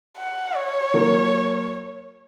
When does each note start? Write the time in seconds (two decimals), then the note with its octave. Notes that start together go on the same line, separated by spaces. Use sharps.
0.18 F#5
0.56 C#5
0.94 F#3 A#3